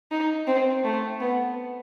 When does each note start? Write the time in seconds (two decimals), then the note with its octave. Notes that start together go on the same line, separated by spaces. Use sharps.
0.11 D#4
0.47 C4
0.84 A3
1.21 B3